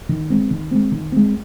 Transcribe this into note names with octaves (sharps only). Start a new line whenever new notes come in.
D#3
G#3 C4
D#3
G#3 C4
D#3
G#3 C4